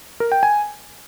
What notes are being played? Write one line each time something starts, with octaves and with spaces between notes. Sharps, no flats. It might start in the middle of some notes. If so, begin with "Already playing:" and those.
A#4
G5
G#5